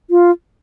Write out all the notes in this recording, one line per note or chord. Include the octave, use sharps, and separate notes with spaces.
F4